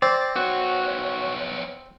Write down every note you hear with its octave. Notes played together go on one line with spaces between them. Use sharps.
C4 D5
B3 F#4 C#5